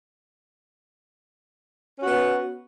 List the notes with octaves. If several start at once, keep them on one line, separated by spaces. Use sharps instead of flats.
B3 C#4 F#4